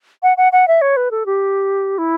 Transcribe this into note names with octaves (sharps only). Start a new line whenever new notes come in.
F#5
F#5
F#5
E5
C#5
B4
A4
G4
E4